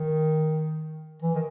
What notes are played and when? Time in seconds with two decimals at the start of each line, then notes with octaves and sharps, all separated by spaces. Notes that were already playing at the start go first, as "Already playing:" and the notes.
Already playing: D#3
1.22 E3
1.35 D#3